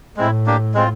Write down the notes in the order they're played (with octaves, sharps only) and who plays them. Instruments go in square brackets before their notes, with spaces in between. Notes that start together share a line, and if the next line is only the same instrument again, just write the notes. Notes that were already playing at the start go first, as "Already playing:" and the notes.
[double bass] A2 [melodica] G#3 C4 E4
[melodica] A#3 D4 G4
G#3 C4 F4